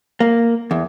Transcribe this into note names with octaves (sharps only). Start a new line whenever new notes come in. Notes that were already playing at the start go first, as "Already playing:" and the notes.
A#3
E2